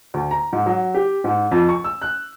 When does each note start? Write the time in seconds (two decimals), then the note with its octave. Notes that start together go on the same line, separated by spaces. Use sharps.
0.14 D2
0.31 A#5
0.53 G#2
0.66 F#3
0.94 G4
1.24 G#2
1.51 F2
1.69 C#6
1.84 E6
2.02 F#6